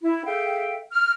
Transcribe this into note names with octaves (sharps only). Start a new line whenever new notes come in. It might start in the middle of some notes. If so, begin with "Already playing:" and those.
E4
G#4 A4 E5 F5 G5
F6